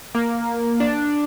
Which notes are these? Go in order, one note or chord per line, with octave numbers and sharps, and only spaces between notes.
A#3
D4